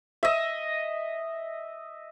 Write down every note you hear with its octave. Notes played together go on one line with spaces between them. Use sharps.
D#5 E5